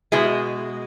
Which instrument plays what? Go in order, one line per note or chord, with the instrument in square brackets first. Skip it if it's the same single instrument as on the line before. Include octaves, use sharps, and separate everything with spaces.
[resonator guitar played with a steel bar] B2 G#3 E4 G#4